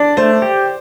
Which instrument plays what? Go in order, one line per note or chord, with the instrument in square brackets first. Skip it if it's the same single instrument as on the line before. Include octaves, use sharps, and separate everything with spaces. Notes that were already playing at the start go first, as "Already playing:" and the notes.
Already playing: [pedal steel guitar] D4 [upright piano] D5
[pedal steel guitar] A3 [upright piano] C5
[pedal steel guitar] G4